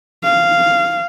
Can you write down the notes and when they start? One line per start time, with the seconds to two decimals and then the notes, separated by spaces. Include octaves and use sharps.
0.24 F5